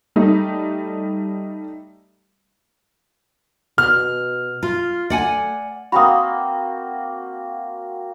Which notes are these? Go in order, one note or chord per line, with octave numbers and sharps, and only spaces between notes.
G3 A3 D#4
B2 F6
F4
A3 D5 F#5 G#5
A#3 C4 F#4 B5 D#6